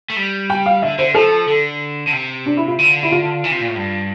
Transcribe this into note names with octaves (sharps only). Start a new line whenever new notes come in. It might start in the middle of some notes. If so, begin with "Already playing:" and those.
A3
G3
G5
F5
D3 E5
D3 C5
F3 A4
D3
D3
C3
D4
E4
F4
D3
E4
F4
E3
C3
A#2
A2
G2